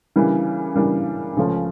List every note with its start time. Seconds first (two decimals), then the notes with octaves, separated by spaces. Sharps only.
0.16 C#3 E3 G3 A#3 D4
0.75 C#3 E3 G3 A#3 D4
1.37 C#2 C#3 F3 A3 C#4